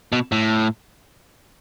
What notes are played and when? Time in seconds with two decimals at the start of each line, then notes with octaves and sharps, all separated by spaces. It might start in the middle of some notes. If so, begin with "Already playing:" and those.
0.12 B2
0.32 A2